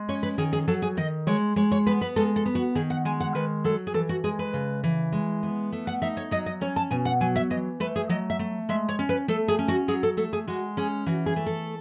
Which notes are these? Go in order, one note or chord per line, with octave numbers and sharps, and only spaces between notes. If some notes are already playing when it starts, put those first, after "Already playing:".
Already playing: G#3
C#4 C#5
B4
D#3 G#4
G#4
F#3 A4
G#4
D#3 D#5
G#3 C#5
G#3 C#5
C#5
B3 B4
B4
G#3 A4
A4
B3
F#4
D#3 G#4
F#5
G#3 G#5
F#5
D#3 B4
F#3 A4
G#4
E3 A4
F#4
G#3 G#4
B4
C#3
E3
G#3
B3
A3
F#5
D#4 E5
C#5
F#3 D#5
D#5
C#4 C#5
A5
B2 G#5
F#5
F#3 G#5
E5
E3 D#5
A3 B4
G#4
F#3 D#5
E5
A3
G#3 E5
C#5
C#4
B4
A3 A4
G#4
C#4
F#4
F#3 G#4
A4
A3 A4
G#4
G#3 F#4
C#4 G#4
E3 F#4
G#4
A3
A4